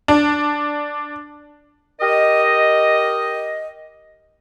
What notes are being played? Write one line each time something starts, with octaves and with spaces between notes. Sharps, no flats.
D4
G4 A#4 D#5